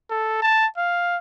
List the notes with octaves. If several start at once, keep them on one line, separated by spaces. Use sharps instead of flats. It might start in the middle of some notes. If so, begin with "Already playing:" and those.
A4
A5
F5